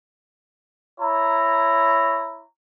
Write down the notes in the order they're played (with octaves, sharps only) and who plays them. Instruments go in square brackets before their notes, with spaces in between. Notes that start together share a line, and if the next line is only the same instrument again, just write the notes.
[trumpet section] E4 C#5 A#5